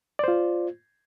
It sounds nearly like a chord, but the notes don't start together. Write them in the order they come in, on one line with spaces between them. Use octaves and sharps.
D5 C5 F4